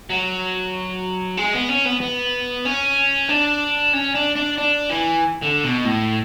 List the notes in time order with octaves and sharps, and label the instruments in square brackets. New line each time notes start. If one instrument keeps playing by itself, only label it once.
[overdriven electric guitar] F#3
G#3
B3
C#4
B3
B3
C#4
D4
C#4
D4
D4
D4
E3
D3
B2
A2